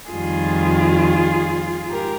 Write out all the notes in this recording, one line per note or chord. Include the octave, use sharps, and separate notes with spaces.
F2 D#3 G3 F4 G#4
G#2 G4 A#4